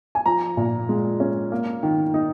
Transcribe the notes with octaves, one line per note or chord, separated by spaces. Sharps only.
G#5
F3 A#5
A#2
G#3
C#4
A#3
D#3
D#4